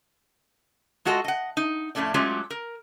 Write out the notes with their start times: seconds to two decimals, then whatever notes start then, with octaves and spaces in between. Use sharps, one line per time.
1.05 G#3 F4 F#4 A4 D#5
1.24 D#5 F#5
1.57 D#4
1.95 F2 A2 A3 C#4 D5
2.14 F#3 G#3 A3 C#4 F4 G4
2.50 A#4